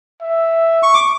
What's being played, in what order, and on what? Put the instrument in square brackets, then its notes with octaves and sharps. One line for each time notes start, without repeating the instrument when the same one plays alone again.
[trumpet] E5
[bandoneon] C#6
D6